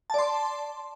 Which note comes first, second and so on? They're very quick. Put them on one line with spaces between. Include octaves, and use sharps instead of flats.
A5 D5 C6